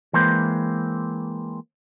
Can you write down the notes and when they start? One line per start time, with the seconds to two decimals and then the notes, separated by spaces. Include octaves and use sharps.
0.13 E3 G#3 A#3 C4 B4 C5